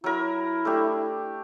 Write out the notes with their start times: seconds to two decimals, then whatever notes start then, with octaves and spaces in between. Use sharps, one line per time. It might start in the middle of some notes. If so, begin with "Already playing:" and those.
0.04 F#3 E4 A#4
0.65 A3 D4 G4